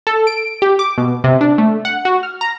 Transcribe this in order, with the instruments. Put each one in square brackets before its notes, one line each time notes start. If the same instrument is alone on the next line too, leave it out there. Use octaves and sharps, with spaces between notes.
[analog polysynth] A4
D7
G4
D6
B2
C3
D4
A3
F#5
F#4
F6
A#5